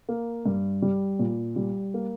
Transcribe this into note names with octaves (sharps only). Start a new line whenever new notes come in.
A#3
G2
G3
A#2
G3
A#3